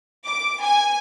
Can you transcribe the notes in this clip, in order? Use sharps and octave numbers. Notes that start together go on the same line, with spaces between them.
D6
G#5